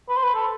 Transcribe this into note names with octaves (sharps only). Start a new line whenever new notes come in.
B4
C5
B4
A4